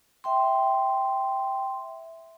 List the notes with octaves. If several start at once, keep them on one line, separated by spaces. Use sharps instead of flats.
E5 G5 C6